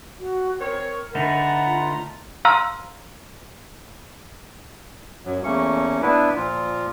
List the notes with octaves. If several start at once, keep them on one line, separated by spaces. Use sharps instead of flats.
F#4
C4 A#4 C#5
D3 A3 D#4 B4 F#5 A5 A#5
F4
F5 A#5 C6 E6 F6
F#2 F#3
E2 A3 A#3 C#4 C#6
B3 D4 E4 B4
A#2 F3 F4